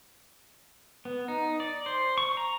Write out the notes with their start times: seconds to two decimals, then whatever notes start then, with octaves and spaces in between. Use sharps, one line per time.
1.05 B3
1.28 D#4
1.60 D5
1.86 C5
2.18 C#6
2.37 A#5